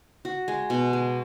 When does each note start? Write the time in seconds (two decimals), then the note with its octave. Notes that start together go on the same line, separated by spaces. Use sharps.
0.25 F#4
0.48 G#3
0.70 B2
0.93 G#3